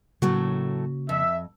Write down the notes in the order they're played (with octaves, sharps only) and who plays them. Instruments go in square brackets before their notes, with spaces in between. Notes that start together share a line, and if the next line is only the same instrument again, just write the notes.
[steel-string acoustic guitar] A2 F#3 A3 [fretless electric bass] C#3 A#3 [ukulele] F#4
[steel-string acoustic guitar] F2 [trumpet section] E5